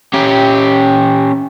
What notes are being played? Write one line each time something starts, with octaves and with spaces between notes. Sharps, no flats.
C#4 G4